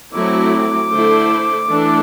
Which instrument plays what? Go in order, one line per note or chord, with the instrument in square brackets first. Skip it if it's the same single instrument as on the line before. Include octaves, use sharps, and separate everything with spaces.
[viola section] F#3 A3 C4 E4 [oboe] D6
[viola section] D3 A3 E4 A4 C5
E3 A3 D4 A4